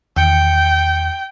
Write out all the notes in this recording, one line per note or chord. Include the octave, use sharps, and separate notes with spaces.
E2 D#3 G5 C#7